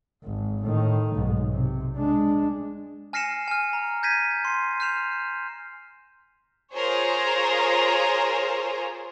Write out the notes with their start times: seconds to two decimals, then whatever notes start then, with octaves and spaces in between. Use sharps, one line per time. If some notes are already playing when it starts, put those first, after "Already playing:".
0.24 G#1
0.63 A2 D#3
1.14 B1 G#2
1.52 C3
1.96 G#3 D4
3.13 G#5 F6 A#6 C7 C#7 E7
3.48 G#5 F6
3.73 A#5
4.03 G6 G#6 A#6 B6 D#7
4.45 C6 C7
4.80 F6 G6 C7 E7 F7
6.72 F4 G#4 A#4 C5 C#5